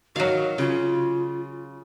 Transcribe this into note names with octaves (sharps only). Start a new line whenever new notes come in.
D#3 F#3 F#4 F5
C#3 F4